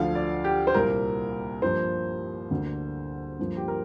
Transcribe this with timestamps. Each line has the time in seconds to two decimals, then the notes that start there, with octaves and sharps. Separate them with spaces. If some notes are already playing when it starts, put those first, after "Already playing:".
Already playing: D2 D3 F3 F5
0.15 D5
0.44 G4
0.67 C5
0.74 C2 A#2 A#3 A#4
1.62 G2 F3 A#3 C5
2.51 D2 D3 A#3
3.39 G2 F3 A#3
3.57 G4
3.68 A#4